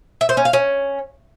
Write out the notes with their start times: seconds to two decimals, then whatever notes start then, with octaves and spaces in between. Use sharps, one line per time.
0.21 E5
0.29 C5
0.37 C#4
0.45 F5
0.53 C#4